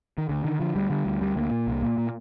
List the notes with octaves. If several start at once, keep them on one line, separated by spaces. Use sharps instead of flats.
D#3
D2 D3
D3 D#3
D3 F3
D2 G3
D3 G3
D2
D2 G3
D2 A#3
A#2
C2
A#2
A#2